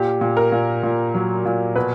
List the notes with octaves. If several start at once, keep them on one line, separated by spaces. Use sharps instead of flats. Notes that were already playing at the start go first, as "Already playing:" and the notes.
Already playing: A#2 G4
A#2
A#4
A#2
A#2
F#3
A#2
B2 B4